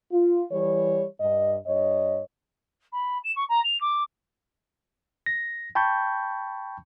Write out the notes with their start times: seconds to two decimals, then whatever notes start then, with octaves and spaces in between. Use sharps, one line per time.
0.12 F4
0.52 E3 G3 C#5
1.20 G2 D#5
1.66 G2 C#5 D#5
2.92 B5
3.24 E7
3.35 C#6
3.49 A#5
3.64 F7
3.80 D6
5.26 A#6
5.75 G5 A5 B5 C#6 G6